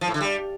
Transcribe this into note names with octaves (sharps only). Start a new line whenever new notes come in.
F3
A2
D3
G3